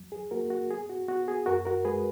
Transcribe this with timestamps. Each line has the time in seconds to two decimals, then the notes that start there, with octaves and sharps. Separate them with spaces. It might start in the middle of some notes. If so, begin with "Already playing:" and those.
Already playing: E2 F#3
0.12 G#4
0.31 A#3 F#4 A#4
0.50 F#4
0.71 B3 G#4
0.90 F#4
1.08 B3 F#4
1.28 G#4
1.46 F#2 F#4 A#4
1.65 F#4 A#4
1.85 G#3 G#4 B4